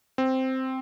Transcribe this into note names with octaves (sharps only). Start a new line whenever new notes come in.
C4